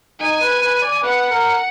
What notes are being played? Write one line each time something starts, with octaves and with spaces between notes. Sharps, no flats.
D#4 G#5
B4
B4
D5
B4 F#5
A#4